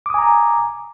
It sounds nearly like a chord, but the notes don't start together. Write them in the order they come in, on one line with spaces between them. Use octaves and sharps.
D6 D#6 G#5 A#5